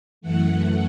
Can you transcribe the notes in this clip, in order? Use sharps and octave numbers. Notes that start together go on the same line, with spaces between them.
F#2 E3 A3 F#5